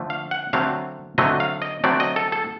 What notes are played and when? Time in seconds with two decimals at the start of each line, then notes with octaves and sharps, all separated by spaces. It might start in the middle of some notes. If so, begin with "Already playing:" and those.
Already playing: D3 F3 A3
0.10 F5
0.31 F#5
0.53 D3 F#3 A3 C4 F5
1.18 D3 F#3 A3 C4 D#5
1.40 F5
1.62 D#5
1.84 D3 F#3 A3 C4 D5
2.00 D#5
2.16 A4
2.32 A4